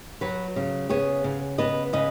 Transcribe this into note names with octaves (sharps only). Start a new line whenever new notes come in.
F#3 F#4 B4
C#3
B3 G#4 C#5
C#3
B3 B4 D#5
C#3 B4 D#5